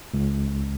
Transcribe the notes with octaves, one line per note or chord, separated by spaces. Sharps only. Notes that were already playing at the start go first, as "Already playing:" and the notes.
C#2